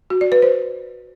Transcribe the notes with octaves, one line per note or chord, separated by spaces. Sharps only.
F#4
D5
B4
C5